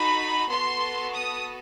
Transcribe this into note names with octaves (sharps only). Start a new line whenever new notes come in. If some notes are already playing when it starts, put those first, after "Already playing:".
Already playing: D#4 F#4 A4 B5
B3 F#4 A4 C6
D#6